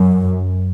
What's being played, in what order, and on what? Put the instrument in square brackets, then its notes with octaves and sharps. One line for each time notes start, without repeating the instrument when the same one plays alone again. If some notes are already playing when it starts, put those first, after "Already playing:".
Already playing: [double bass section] F#2